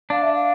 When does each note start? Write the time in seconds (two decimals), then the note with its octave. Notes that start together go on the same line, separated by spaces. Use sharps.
0.10 D4 F5
0.22 E5
0.34 F5